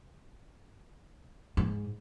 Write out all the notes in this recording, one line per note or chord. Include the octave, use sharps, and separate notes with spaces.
G#2